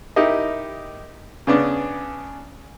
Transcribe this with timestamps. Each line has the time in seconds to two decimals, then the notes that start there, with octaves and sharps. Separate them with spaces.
0.16 D#4 E4 G4 A#4 D#5
1.47 C#3 B3 C#4 D4